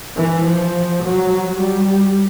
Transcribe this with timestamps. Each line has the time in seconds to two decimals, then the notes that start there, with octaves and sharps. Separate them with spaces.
0.16 E3
0.45 F3
1.03 F#3
1.61 G3